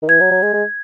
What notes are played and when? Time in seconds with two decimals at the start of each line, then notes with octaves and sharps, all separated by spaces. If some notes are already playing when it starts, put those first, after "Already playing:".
0.02 D#3
0.09 E3 G#6
0.20 F#3
0.31 F#3
0.42 G#3
0.53 G#3